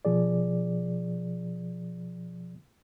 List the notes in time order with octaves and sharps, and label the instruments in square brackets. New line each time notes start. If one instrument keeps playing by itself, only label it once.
[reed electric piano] B2 F3 G#4 D5